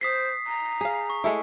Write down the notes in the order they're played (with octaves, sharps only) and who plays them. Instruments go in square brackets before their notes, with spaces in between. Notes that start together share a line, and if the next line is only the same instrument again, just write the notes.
[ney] C5 [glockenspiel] D#6 B6 C7
[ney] A#5
[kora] G#4 F5
[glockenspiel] C#6
[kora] G#3 A3 E4